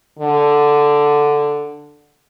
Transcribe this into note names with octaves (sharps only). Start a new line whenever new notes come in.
D3